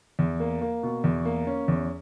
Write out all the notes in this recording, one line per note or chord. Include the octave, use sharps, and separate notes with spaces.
E2
A#3
A#3
B2
E2
A#3
C#4
E2